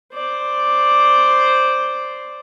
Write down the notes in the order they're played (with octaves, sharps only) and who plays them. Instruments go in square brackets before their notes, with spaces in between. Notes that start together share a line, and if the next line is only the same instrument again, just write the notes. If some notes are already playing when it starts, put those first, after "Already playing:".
[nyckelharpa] C5 D5